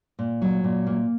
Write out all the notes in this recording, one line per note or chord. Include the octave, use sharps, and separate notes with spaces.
A#2
F#3
A#2
A#3